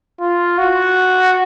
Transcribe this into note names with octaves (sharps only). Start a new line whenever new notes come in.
F4
F#4